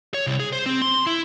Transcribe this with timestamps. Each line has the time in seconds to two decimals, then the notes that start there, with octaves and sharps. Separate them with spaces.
0.14 C#5
0.27 C2
0.40 G#4
0.53 C5
0.66 C4
0.82 C6
1.07 E4